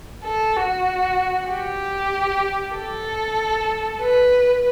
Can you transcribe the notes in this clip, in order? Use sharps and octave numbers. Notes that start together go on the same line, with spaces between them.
A4
F#4
G4
A4
B4